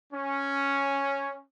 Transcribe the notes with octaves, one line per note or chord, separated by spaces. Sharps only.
C#4